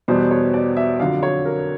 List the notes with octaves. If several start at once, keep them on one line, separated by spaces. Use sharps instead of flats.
E2 B2 G3 B3 C5
C#5
D5
E5
F2 D3 F#3 F5
C#5
A#4